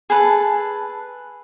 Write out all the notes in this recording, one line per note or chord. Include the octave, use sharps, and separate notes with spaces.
G#4 A4 B4 A5